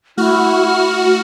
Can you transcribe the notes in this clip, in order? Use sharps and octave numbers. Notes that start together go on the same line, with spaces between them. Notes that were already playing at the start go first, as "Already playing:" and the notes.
A3 E4 F#4 F6